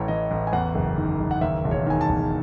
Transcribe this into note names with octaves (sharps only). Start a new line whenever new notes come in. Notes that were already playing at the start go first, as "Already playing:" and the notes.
Already playing: A1 A2 C#5
E3 D#5
A1
G#5
E2 F#5
F#1
D#3
F#1
F#5
D#2 E5
E1
C#5
D#3 G#5
A5
E1